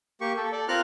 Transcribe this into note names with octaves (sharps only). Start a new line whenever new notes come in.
A#3 G4 C#6
A4
A4 D5
C4 F4 A#4 F5 F6 F#6